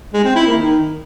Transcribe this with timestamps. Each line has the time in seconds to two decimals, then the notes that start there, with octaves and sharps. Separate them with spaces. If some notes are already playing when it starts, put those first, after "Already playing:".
0.14 G#3
0.25 C4
0.36 E4
0.47 A#3
0.58 D#3